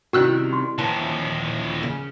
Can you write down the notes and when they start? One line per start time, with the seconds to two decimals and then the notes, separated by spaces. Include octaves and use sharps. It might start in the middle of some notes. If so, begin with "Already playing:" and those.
0.13 C3 D#3 G3 C#4 E4 F#4 E6 F#6
0.53 C6
0.78 D#2 A#2 E3 F3 A5
1.83 C#3